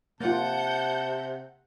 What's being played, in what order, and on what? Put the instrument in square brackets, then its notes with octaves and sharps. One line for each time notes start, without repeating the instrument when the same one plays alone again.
[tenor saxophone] C3 [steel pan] A#3 F4 [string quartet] F#5 G6 [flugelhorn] A5